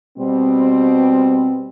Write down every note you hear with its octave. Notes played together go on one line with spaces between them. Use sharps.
B2 G3 C4